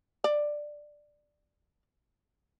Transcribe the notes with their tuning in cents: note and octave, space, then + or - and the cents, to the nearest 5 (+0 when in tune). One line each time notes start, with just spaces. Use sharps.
D5 +10